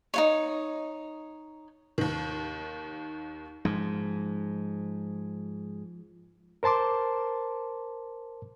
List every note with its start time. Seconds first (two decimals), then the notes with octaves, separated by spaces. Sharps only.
0.14 D#4 F4 C#5
1.98 D#2 D#3
3.65 G#2 F3 G#3
6.63 A#4 C5 A5 C6 D6